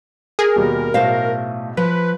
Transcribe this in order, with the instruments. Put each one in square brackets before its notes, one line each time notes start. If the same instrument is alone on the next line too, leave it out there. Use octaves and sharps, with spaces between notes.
[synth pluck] G#4 [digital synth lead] A#4
[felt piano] D#2 B2 G3
[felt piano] B1 A2 [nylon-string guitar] A3 C5 F5
[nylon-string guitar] F3 [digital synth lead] B4